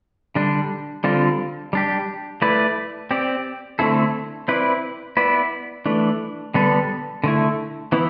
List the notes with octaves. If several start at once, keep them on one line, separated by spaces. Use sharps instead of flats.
D3 G3 D4
D3 G3 C4 F4
G3 D4 G4
A3 E4 B4 D5
C4 G4 D5
D3 A3 C4 E4 A4
C4 E4 B4 D5
B3 E4 B4 D5
E3 A3 D4
D3 G3 B3 D4 A4
D3 A3 E4
E3 B3 E4